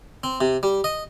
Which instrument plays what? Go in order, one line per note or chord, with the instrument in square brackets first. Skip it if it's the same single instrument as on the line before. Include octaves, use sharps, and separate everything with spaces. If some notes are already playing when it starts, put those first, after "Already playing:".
[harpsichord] C4
C3
G3
D#5